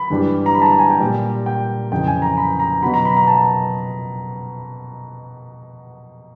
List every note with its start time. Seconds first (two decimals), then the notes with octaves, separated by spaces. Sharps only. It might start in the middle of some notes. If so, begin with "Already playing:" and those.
Already playing: B5
0.10 G2 E3 G3
0.46 A#5
0.55 B5
0.62 A5
0.66 A#5
0.79 G#5
0.90 G5
1.00 A#2 G3
1.46 G5
1.91 F2 C#3 E3 G5
2.07 G#5
2.22 A#5
2.37 B5
2.60 A#5
2.83 B2 F#3 B5
2.94 A#5
3.05 B5
3.17 A#5
3.27 A5